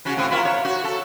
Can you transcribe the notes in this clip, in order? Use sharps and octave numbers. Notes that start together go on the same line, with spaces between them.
C#3 C#4 F#4
A2 C4
E4 F4 A#4
C#5
F#4
A4